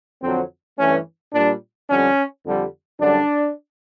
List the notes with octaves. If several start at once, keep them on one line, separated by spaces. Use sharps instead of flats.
F2 D3 F#3 C4
G2 E3 A3 C#4
A#2 G3 D4
F2 D3 G3 C#4
F2 D3 G3
F#2 D3 G3 D4